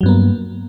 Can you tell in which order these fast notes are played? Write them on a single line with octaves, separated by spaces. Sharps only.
F#3 G2 B3 A#3